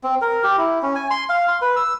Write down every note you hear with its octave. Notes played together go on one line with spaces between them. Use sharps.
C4
A#4
G4
E4
C#4
G#5
C6
F5
C6
B4
E6